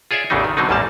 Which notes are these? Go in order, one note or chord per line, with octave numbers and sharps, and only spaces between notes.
F4 G#4 C#5 D5 E5
A1 E2 C#3 E3 A3 D#4
D#3
B2 D3 F#3 C4 D#4
A1 E2 G#2 G3 A#3 A5